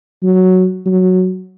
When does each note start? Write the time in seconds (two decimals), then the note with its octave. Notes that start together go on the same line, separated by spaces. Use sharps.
0.23 F#3
0.86 F#3